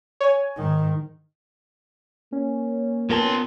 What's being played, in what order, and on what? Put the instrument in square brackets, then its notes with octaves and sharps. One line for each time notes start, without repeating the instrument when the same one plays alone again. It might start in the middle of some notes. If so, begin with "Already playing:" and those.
[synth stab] C#5 G#5
[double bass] G#2 D#3
[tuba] A#3 [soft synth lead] C#4
[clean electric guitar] A#2 A#4 A5 [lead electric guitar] B3 C6